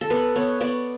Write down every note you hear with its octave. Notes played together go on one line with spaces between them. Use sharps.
A4
B3 B4
B3 C#5
B3 D5